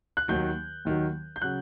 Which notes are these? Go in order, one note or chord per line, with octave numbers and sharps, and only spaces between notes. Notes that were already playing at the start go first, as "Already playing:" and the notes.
F#6
D#2 D#3 F#3 G6
D#2 D#3 F#3
G6
C#3 F#3 F#6